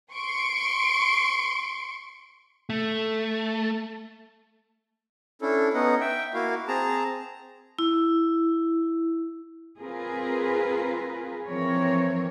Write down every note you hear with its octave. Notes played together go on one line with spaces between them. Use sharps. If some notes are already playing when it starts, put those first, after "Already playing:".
C6 C#6 D7
A3
C#4 D4 E4 A4
B3 C#4 D#4 D#5 F#5
E5 G5
A#3 E4 F#4 F5
C4 G#4 A5 A#5
E4
C4 F4 G#4 A#4 B4
E3 F3 C4 A#4 C#5